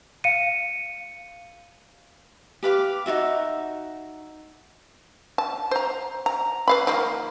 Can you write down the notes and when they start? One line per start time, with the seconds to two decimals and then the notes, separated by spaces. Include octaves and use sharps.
0.24 F5 C#7 D#7
2.63 G4 B4 F5 D6
3.06 D#4 F4 F#4 E5
5.38 A5
5.71 C5 A#5
6.26 A#5
6.68 B4 F5 B5
6.87 D#3 F3 A#3